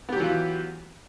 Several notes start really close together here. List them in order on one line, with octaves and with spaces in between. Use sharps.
B3 G4 F#3 E3 F4